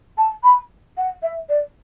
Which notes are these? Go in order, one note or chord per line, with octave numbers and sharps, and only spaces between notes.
A5
B5
F#5
E5
D5